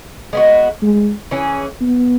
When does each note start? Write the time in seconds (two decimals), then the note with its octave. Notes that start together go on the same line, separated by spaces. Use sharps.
0.33 G#3 B3 F#4
0.82 G#3
1.31 E3 C#4 G#4
1.81 B3